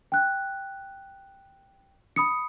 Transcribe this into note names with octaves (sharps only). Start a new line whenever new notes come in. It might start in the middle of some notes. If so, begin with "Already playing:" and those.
G5 F#6
B5 D#6 C#7